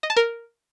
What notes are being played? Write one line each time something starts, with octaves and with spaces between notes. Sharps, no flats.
D#5
A5
A#4